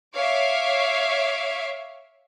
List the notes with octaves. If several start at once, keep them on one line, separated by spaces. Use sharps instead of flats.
C#5 E5 F5 D6